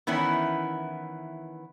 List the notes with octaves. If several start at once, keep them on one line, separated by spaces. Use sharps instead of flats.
D#3 E3 B3 C#4 E4